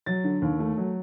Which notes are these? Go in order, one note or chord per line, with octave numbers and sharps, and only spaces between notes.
F#3 A6
D3
D#2
A3
F#3